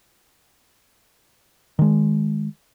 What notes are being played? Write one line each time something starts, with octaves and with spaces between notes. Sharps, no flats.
D#3 G#3